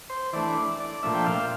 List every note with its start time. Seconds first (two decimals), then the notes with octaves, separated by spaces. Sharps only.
0.10 C5
0.33 E3 A3 D4 D5
0.80 D5
1.03 A#2 F3 A3 D4 E5
1.15 G5
1.26 F5